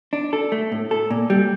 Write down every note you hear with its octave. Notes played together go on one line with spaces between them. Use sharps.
D4
A4
A3
A2
A4
A#2
G3